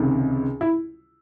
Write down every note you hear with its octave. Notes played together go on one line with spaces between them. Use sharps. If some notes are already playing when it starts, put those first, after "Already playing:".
Already playing: C#2 C3 D#3
E4